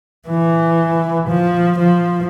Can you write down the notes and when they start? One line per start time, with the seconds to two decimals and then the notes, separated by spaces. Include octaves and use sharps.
0.28 E3
1.29 F3
1.78 F3